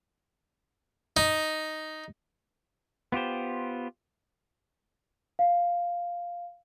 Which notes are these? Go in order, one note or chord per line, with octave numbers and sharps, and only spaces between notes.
D#4
B3 F4 G4 C5
F5